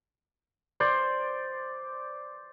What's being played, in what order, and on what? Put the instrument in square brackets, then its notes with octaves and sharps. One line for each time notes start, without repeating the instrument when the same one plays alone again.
[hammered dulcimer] C5 D5